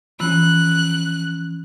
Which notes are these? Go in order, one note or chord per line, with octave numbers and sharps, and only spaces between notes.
E3 F3 C#4 F#6